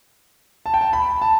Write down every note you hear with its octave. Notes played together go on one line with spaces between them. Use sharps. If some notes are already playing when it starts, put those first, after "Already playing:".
A5
G5
A5
B5
A5